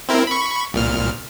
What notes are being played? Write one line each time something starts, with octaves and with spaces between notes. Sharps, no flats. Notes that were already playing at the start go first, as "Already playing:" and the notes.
C4 E4 A#4
B5 C#6
C2 A#2 F6